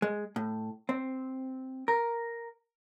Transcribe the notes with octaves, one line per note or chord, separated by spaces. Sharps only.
G#3
A2
C4
A#4